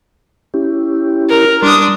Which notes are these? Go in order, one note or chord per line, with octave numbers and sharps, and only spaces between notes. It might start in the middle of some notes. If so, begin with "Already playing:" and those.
C#4 E4 G4
A#4
G3 D4 C6 D#6